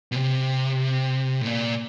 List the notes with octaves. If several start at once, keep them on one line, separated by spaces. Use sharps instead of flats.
B2
C3
A2
A#2